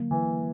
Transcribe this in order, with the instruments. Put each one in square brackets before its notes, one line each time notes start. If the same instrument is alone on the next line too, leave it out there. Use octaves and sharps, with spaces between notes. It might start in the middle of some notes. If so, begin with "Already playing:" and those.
Already playing: [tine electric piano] D3 F#3 A#3
[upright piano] E3